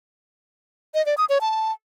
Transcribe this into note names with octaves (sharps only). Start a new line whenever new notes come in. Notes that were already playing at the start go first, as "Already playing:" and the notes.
D#5
D5
D#6
C#5
A5